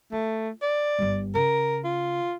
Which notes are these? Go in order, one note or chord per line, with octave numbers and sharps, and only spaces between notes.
A3 F4
D5
G1 G2
C#3 A#4
F4